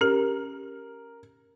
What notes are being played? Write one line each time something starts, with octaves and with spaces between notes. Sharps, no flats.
C#4 G4 A#4